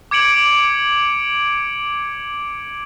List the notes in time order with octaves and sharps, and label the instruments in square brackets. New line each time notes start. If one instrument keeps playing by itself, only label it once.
[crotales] D6 G#6 C#7 D7 F#7